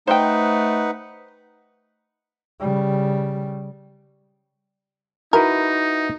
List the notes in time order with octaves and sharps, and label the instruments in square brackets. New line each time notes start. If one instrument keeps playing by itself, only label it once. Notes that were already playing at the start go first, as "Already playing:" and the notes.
[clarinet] A3 [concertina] D#4 [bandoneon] B4 F#5 [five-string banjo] C5 G5
[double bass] C#3 G3
[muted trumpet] D#4 [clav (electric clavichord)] E4 F#4 B4 [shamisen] A#4